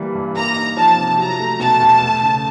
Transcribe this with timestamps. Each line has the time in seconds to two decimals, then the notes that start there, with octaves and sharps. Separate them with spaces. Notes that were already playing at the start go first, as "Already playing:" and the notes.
Already playing: E3 G3 A#3
0.15 G2
0.35 A#3 A#5
0.56 D#4
0.77 F3 A5
0.97 C3
1.18 F#3 A#5
1.40 A3
1.60 B2 A5
1.81 E2
2.02 A3
2.23 C#3